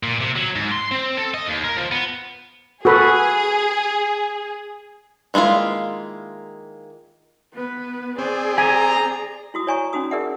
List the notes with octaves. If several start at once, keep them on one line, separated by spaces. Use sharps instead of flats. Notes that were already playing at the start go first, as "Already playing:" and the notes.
A#2
C3
F#3
G#2
C6
C4
A4
D#5
D#2
A#4
F3
B3
F#4 G#4 A4 B4
D#3 G#3 A#3 E4 F4
B3 B4
C4 G#4 D5
G#5 A#5
E4 F#4 D#6
C#5 D5 G#5 A#5 C#6
C#4 D#4 F#4 D#6
G#4 A#4 D5 E5 F#5